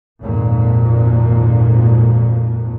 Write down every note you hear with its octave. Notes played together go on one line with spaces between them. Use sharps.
G#1 F2 A#2